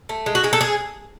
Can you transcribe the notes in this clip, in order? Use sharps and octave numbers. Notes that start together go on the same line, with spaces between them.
A3
G#3
F#4
G#3 G#4
A4
G#4